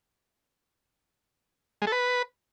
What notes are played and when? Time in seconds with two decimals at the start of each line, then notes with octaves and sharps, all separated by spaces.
1.82 G#3
1.87 A4
1.92 B4